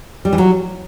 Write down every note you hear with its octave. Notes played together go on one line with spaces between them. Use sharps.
G3
E3
F#3